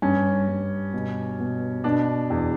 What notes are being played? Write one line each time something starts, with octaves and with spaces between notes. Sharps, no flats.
G2 C#4
G2
B2
B2
B2 D4
E2